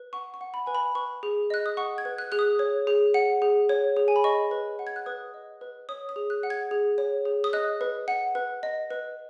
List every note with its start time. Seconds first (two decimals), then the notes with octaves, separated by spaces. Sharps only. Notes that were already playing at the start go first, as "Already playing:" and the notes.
Already playing: B4
0.13 F#5 C#6
0.34 C#6
0.41 F#5
0.54 B5
0.66 B4 G#5
0.75 B5
0.95 B4 C#6
1.23 G#4
1.50 D#5 F#6
1.66 D#6
1.77 F#5 C#6
1.98 G#6
2.05 B4
2.18 F#6
2.32 G#4 F#6
2.39 D#6
2.59 C#5
2.87 G#4
3.14 F#5
3.42 G#4
3.69 C#5
3.97 G#4
4.08 G#5
4.16 B5
4.24 D#5 C#6
4.51 B4
4.79 F#5
4.87 G#6
4.96 F#6
5.06 B4 D#6
5.34 D#5
5.61 B4
5.89 C#5 D#6
6.09 D#6
6.16 G#4
6.30 F#6
6.43 F#5
6.50 G#6
6.71 G#4
6.98 C#5
7.25 G#4
7.44 D#6
7.53 D#5 F#6
7.81 B4
8.08 F#5
8.35 B4
8.63 D#5
8.90 B4